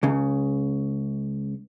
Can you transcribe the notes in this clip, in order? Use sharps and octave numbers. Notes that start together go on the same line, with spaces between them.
C#2 C#3